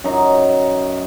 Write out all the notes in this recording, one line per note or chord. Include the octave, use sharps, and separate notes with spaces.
F#2 D#4